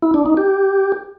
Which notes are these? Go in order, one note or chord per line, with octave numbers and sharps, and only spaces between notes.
E4
D4
D#4
G4